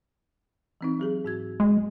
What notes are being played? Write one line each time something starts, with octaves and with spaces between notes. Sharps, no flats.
E3 C4 D#4
F#3 G4 G#4
G#2 F#4 G#6
G#3